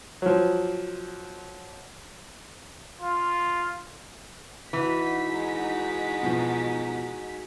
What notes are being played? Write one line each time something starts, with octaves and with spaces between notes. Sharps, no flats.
F3 F#3
F4
E3 D#4 F#4 B6
G#3
B2 F3